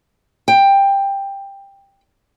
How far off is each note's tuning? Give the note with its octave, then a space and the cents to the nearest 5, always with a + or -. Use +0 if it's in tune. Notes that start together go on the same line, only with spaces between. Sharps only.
G5 +15